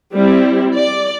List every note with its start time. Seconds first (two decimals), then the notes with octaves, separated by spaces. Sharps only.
0.14 G3 C4 E4
0.76 D5